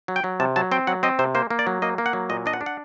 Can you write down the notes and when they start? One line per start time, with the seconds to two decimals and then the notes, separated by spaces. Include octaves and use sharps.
0.08 F#3
0.16 G5
0.24 F#3
0.40 C3 A5
0.56 F#3 A5
0.72 C4 G5
0.87 F#3 F#5
1.03 C4 D#5
1.19 C3 C5
1.35 A#3 C5
1.50 A#3
1.59 D5
1.67 F#3
1.82 A#3 D#5
1.98 A#3
2.06 F#5
2.13 F#3
2.30 A#2 D#5
2.46 D4 D#5
2.53 F#5
2.61 D4
2.66 F#5